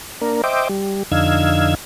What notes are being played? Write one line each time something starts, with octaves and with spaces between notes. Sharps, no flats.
A#3 D4 A#4
C5 D#5 E5 G5 D6
G3
F2 D3 D#4 F5 E6 G#6